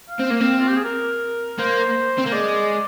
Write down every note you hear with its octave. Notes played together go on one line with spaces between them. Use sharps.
F5
C4
A#3
C4
F4
G4
G#4
A#4
A#3 C5
C4
A#3
G#3 D5